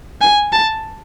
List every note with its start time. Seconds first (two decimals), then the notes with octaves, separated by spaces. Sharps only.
0.21 G#5
0.52 A5